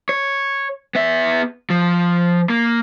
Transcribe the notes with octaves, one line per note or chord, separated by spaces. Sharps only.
C#5
B3 E5
F3
A#3